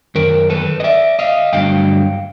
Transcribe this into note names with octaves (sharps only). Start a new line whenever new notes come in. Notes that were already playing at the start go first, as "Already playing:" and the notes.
F#2 D#3 A#4
A4 B4
D#5
D5 E5
D#5 F5
G2 D3 F#3 A3 F5 G5